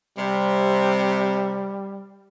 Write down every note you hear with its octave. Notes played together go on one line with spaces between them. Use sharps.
C3 G3